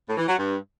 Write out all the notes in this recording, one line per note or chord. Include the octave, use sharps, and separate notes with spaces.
A2
E3
F#3
G2